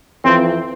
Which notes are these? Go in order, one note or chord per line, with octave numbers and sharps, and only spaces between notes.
F2 E3 C4